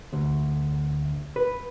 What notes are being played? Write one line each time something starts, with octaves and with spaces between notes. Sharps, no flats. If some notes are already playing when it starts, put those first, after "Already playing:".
D2
B4